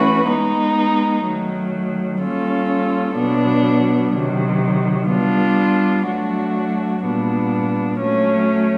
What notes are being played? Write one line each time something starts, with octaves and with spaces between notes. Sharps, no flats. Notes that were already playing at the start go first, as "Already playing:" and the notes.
Already playing: E3 A3 C#4 F#4 B4
G#3 B3 D#4
D#3 F#3 A3
G3 A#3 C#4 F4 A4
B2 F#3 B3 D4
C3 D#3 F#3
G3 B3 D4 F4
F#3 A3 D4 F#4
A#2 G3 B3 D4
F#3 A3 C#4